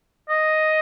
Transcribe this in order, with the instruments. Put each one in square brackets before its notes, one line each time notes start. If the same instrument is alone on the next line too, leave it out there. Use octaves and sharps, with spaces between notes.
[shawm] D#5